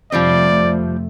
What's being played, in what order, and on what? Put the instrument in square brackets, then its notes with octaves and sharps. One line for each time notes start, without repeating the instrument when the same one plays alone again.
[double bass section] F2 C3 A3 [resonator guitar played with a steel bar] F3 G3 C4 [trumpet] D5